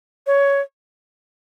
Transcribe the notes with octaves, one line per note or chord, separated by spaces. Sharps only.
C#5